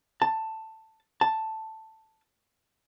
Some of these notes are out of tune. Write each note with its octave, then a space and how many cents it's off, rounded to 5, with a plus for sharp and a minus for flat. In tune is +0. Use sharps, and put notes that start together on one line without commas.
A5 +10
A5 +5